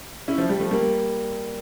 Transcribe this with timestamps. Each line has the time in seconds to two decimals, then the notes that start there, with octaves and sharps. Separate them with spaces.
0.28 C#4 E4
0.38 F3
0.49 G3
0.60 F3 A3
0.71 G3 A#3